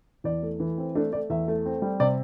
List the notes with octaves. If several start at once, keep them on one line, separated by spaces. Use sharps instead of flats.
E2 D5
A3
E3
C4
A3 D4
A3 D5
E2 E5
A3
C4
G3
C3 D5